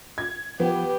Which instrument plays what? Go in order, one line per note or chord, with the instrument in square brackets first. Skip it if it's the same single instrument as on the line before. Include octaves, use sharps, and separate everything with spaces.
[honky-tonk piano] G#6
[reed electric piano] F3 [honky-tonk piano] B3 [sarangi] G4